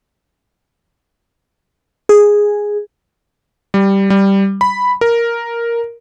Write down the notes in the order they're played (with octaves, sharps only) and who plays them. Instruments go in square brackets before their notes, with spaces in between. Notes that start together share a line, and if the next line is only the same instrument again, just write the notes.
[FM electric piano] G#4
[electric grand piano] G3
G3
B5
A#4